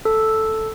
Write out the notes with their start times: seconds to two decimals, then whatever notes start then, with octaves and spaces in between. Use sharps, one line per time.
0.05 A4